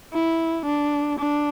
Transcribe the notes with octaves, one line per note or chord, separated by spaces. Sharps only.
E4
D4
D4